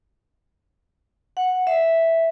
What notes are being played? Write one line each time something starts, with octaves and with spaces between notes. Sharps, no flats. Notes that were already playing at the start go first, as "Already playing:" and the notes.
F#5
E5